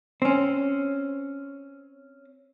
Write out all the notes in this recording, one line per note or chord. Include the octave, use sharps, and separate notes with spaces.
C4 C#4